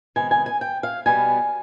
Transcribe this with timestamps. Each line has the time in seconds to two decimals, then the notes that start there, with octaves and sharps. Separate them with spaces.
0.16 C3 D#3 G#3 B3 G#5
0.31 G#5
0.46 G#5
0.61 G5
0.83 F5
1.06 B2 G3 B3 G#5